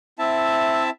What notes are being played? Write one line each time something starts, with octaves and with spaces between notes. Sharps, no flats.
C4 E4 E5 A5